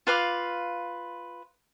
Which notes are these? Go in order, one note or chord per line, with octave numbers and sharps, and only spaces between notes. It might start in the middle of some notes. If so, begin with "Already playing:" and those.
F4 B4 F5 D6